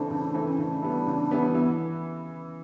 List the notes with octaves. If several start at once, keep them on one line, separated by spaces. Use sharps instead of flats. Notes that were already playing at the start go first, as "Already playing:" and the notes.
Already playing: C#3 E3 A3 C4 D4
C#3
E3 A3 C4
C#4
C#3 D4
E3 G3 B3
C#3
E3 G3 B3
E3 B3